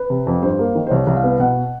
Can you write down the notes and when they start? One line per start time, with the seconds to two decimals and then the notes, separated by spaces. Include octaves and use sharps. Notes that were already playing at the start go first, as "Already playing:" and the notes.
Already playing: B4
0.10 C3
0.27 F2
0.42 G2 C5
0.59 A#3
0.75 D#3
0.87 C5
0.91 C2 C#5
1.07 C2
1.15 F5
1.24 B3
1.39 B2 F#5